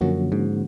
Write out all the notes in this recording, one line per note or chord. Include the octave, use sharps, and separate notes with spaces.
F#2 D3 F3 A#3 C#4 F#4
G#2